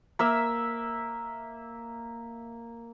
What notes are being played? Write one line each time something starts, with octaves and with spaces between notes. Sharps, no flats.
A#3 E5 E6